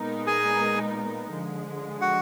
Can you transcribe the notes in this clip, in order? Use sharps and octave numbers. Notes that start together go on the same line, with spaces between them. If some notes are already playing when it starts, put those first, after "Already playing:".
Already playing: A#2 G#3 B3 D#4 A#4
G#4 G#5
D3 F3 G#3
F#4 F#5